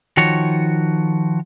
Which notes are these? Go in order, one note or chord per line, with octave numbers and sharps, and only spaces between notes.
D#3 F3 F#4 C#5